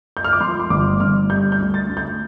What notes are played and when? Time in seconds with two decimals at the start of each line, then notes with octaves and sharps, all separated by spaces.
0.17 G6
0.24 F6
0.32 D6
0.40 F3 C6
0.60 C6
0.70 G1 D6
1.00 G1 F6
1.30 G3 G6
1.52 G6
1.60 D2
1.74 A6
1.89 D2
1.97 G6